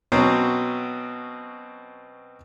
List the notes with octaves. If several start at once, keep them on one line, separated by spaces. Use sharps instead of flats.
B2 F#3 C4 C#4